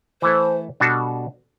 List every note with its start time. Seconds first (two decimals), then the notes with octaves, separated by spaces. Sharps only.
0.22 E3 A3 E4 A4 C5
0.80 B2 G3 D4 F#4 A4